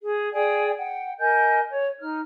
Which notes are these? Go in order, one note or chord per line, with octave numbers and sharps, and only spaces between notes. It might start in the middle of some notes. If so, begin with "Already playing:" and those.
G#4
G#4 D5 G5 G#5
F#5 G5
A#4 D#5 G#5 G6
C#5
D#4 F6